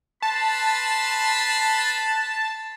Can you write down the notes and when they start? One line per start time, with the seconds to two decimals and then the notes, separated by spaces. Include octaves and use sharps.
0.22 B4 A5 B5 C6